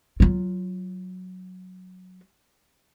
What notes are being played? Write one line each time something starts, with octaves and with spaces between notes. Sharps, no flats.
F#3 F4